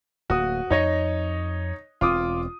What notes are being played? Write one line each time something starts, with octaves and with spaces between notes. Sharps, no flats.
D1 A#3 F#4 D#6
F2 D#4 C#5 D#5
E1 C4 F4 D6 D#6